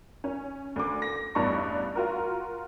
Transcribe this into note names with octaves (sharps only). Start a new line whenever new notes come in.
C#4
D2 D6
A#6
A1 E2 G2 D5 A5 C#6
F4 F#4 A#4